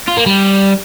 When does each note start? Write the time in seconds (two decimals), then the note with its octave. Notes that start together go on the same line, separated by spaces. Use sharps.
0.08 F4
0.17 A#3
0.26 G3